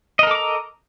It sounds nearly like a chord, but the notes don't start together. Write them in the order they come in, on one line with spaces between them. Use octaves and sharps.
D#5 A#4 A4 D6 A#5